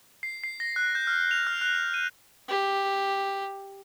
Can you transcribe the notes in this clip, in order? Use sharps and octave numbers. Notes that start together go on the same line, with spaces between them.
C7
C7
A#6
F#6
G6
F6
F7
F6
F#6
F7
D#7
G4